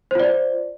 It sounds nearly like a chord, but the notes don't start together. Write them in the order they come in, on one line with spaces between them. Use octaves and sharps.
C5 F4 D5